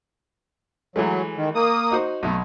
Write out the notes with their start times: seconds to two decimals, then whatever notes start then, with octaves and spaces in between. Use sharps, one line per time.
0.96 E3 F#3 G#3 A3
1.36 D#3
1.55 A#3 D#6
1.91 D#4 F#4 C5
2.23 B1 B2 A3